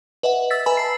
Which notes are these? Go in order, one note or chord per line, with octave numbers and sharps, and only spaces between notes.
B4 D#5 E5 F#5
E6 A6 B6
B4 G#5 A#5 B5
A5 C7